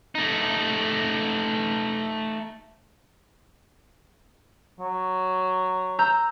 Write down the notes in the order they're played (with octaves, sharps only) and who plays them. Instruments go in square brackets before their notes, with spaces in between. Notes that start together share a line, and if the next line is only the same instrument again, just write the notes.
[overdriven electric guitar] A3 D#4
[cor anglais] F#3
[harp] A#5 E6 G6